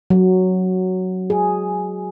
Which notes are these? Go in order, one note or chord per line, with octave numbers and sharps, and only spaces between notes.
F#3
G#4